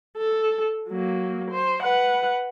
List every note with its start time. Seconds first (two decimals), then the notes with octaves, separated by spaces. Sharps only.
0.17 A4
0.89 F#3 A#3
1.51 C5
1.81 B4 F#5